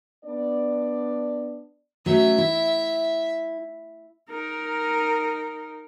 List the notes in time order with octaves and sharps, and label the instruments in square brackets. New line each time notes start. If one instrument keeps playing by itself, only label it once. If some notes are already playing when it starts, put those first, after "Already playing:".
[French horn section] B3 D4 D5
[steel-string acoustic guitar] F#3 A3 C#4 [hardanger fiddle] E5
[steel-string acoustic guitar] E4
[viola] D#4 A#4